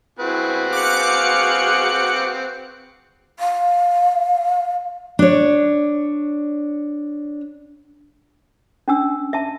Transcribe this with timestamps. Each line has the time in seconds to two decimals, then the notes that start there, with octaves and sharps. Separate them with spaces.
0.19 C4 E4 F#4 G#4 B4
0.72 G#4 F5 D6 F#6 C#7
3.39 F5
5.19 D4 C#5
8.88 C#4 D4 E6
9.33 E5 A5